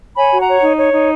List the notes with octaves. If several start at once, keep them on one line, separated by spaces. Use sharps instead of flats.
C#5 G#5 B5
F#4
F#5 A#5
C#5
D#4
C#5
D#4